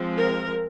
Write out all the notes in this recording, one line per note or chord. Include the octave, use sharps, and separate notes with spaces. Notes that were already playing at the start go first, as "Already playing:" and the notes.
Already playing: F3 G#3 C4
A#4